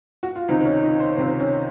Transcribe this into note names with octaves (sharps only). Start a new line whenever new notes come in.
F#4
F4
C#2 C3 D#3 D#4
C#4
D#4
C5
C#2 C3 D#3 C5
C#4